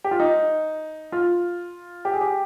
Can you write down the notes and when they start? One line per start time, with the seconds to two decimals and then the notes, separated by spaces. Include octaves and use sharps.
0.04 G4
0.11 F4
0.20 D#4
1.12 F4
2.05 G4
2.14 G#4
2.21 G4